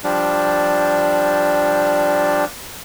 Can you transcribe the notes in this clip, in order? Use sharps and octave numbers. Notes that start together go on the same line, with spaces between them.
F3 G3 D4